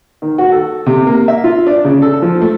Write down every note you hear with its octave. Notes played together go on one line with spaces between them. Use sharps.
D#3
F#4
A4
C3
A#3
E5
F4
D4
C#3
A4
F3
A3